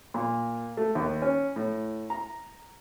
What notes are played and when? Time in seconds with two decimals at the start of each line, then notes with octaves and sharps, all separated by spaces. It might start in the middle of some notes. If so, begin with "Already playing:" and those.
0.14 A#2
0.77 A3
0.95 D#2
1.22 C#4
1.56 A2
2.10 A#5